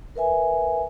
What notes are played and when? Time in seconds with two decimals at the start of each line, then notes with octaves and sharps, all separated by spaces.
0.16 A#4 B4 E5 G#5